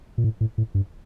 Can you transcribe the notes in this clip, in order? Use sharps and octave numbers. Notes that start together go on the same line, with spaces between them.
A#2
A2
A2
A2
G2